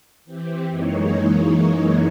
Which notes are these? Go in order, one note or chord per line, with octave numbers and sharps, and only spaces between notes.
E3 C4 G4
F#2 E3 G#3 A#3 D#4 C#5